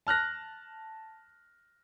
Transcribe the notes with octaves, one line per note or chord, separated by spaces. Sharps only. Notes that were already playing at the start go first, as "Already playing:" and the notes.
A5 F6 F#6 A#6